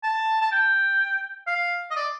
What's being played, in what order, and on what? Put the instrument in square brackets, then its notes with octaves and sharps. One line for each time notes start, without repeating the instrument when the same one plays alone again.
[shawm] A5
A5
G5
F5
D#5
D5